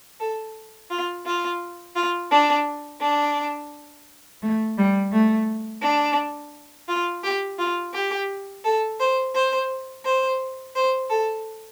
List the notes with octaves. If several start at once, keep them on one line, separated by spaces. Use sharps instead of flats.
A4
F4
F4
F4
D4
D4
A3
G3
A3
D4
F4
G4
F4
G4
A4
C5
C5
C5
C5
A4